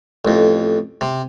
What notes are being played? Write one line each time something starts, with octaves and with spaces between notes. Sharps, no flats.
A1 F2
C3